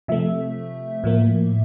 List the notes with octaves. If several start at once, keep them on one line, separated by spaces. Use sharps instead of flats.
C3 F3 A3 E5
A2 F3 A#3